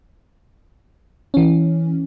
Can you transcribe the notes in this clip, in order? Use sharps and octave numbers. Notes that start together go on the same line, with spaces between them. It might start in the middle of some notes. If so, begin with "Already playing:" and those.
E3 C#4